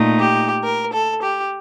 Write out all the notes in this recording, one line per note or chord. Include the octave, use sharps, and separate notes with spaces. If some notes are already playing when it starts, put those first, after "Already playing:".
Already playing: A#2 A3 D#4
G4
A#4
A4
G4